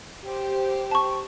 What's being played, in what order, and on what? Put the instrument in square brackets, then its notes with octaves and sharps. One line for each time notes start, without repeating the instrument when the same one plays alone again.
[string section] G4 C5
[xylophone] A5 C#6